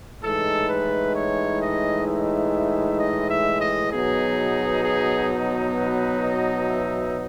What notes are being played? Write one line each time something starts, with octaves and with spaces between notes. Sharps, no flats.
A2 E3 G#3 D#4 A4
B4
C#5
D#5
E5
D#5
E5
D#5
B2 F#3 B3 D#4 G#4
G#4
B4
D#5
E5